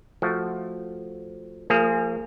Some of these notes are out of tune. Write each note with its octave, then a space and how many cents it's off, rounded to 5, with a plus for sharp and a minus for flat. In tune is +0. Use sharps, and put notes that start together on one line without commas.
F3 +5 A3 +0 F#4 +0
F3 +0 A#3 -35 G#4 +0